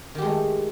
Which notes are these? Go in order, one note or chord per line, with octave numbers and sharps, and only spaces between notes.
D#3 G#3 A3 G4